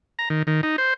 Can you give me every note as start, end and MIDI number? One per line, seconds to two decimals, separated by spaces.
0.19 0.29 82
0.30 0.43 51
0.47 0.61 51
0.63 0.76 63
0.78 0.94 72